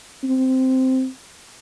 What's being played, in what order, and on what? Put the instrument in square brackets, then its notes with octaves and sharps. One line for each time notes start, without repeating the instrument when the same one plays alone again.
[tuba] C4